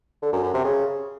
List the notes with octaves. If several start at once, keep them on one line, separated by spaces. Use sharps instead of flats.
D3
F#2
F#2
C3
C#3